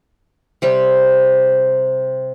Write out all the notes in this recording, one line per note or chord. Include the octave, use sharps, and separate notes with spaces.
C3 G3 C4